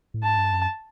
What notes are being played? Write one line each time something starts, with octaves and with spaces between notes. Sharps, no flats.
A2
G#2 A5
G2
F#2